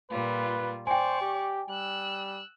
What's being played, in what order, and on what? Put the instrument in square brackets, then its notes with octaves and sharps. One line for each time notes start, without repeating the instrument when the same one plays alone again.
[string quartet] A#2 G3 F4 [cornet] B4
[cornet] C5 [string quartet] D5 C#6 [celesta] G5 G#5
[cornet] G4
[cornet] G3 [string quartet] E6 F#6